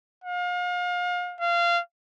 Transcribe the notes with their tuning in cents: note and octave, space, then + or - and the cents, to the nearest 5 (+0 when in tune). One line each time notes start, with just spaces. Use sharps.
F5 +35
F5 -20